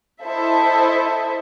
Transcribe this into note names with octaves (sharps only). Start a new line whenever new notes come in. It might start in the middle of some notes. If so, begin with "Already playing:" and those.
E4 A4 C5 D#5 E5